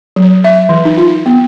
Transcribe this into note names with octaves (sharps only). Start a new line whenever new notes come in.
F#3
E5
E3
D#4
F4
B3